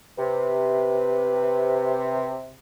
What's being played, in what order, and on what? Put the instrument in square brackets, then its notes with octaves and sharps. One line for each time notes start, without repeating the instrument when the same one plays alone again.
[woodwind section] C3 [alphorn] B4